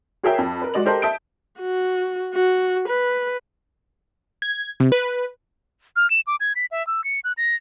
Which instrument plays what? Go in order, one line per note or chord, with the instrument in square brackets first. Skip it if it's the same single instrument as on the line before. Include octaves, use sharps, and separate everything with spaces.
[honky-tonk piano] F#4 G#4 A#4 C#5 E5 G5
F2
A#4 B4
G#3 F#4 D5 D#5 F#7
G4 A4 A#4 C5 D#5
E5 A5 D#6 G6 D7
[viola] F#4
F#4
B4
[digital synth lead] G#6
C3
B4
[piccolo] F6
E7
D6
G#6
B6
E5
E6
C#7
F#6
A#6